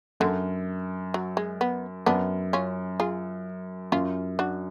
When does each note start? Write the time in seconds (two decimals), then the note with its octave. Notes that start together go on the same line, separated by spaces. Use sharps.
0.20 F#2 D3
1.14 F#3
1.37 G#3
1.61 B3
2.06 F#2 B3 D4
2.53 C#4 F4
3.00 F4 G#4
3.92 F#2 C#4 F4
4.39 D4 F#4